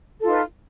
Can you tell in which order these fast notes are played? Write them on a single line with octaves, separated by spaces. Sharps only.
A4 F4 D#4 B4